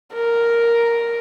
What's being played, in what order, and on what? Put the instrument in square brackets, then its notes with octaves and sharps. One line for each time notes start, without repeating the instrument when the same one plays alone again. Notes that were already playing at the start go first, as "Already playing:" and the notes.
[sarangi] A#4